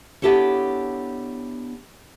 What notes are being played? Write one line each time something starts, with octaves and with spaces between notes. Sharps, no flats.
B3 D4 E4 G4 A4 C#5